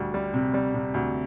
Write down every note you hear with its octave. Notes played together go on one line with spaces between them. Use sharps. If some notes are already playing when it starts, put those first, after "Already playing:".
Already playing: D2 G3
G3
C3
G3
C3
D2